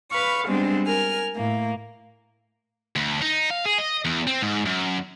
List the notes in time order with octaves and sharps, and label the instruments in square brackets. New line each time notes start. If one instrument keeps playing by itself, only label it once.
[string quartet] B4 F5 B5 C#6
G3 G#3 B3 C4 D4
A#4 G#5 F6
A2 A#3
[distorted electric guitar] D2
D#4
F5
G#4
D#5
E2
C4
G#2
F#2